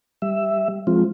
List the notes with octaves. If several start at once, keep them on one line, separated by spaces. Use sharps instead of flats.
G3 E5
F3 G#3 C4 F4